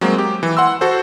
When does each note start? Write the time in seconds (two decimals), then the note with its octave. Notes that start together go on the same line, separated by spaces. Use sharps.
0.01 F#3 G#3 A#3 C4
0.18 G4
0.43 E3
0.57 F#5 C6 E6
0.81 F#4 A4 C5